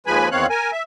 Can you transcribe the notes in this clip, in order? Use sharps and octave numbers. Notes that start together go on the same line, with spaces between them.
D#2 F3 G#3 B4 G#5 B5
E2 D#3 C4 C#5 F5 F#6
A#4 G#5
E5